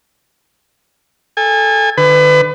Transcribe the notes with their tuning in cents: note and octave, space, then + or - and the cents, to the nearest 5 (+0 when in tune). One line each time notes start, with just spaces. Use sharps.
A4 -5 G#5 -30
D3 +35 B4 +30